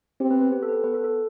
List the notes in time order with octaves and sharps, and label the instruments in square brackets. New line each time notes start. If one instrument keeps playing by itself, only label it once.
[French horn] C4 [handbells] G4
[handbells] B3 B4
B3 B4
G4
A4
B4
A4
B3 B4
A4
A4